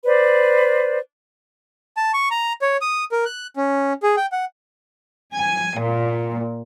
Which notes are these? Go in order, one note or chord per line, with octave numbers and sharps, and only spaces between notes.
B4 C5 D5
A5
C#6
A#5
C#5
D#6
A#4
F#6
C#4
G#4
G5
F#5
G#5
A#2